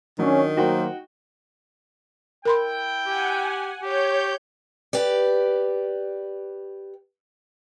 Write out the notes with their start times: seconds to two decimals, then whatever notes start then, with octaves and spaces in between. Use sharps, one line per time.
0.19 D#3 F#3 C#4 D4
0.56 F#3 A#3 D#4 F#4 C5 G5
2.45 E4 A#4 G5 B5 C6
3.07 G4 F#5 G#5
3.82 G4 C#5 G6
4.93 G4 B4 D5